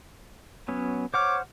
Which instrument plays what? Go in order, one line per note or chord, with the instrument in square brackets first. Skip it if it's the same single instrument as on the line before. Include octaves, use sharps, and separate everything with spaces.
[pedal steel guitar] F#3 B3 C#4
[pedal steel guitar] C5 F#5 F6 [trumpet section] C#5 D6